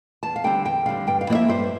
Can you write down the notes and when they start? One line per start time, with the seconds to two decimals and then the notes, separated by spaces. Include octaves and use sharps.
0.23 E2 A5
0.36 F5
0.44 D3 G3 C4 G5
0.65 E2 G5
0.86 D3 G3 C4 F5
1.07 G2 G5
1.21 F5
1.27 F3 A#3 E4 D5
1.35 E5
1.48 G2 C5